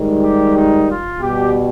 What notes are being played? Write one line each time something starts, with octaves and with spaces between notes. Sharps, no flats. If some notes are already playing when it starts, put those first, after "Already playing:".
Already playing: G#2 D#3 G3
G4
D#4
F4
B2 G3 G4